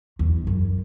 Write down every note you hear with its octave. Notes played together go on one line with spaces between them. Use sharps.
E2
F#2